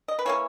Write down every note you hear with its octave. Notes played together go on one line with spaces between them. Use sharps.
D#5
B4
E3 A#3 C#4 C#5